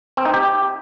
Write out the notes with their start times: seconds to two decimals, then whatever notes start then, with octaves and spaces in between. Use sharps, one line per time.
0.17 C4
0.25 D#4
0.34 G4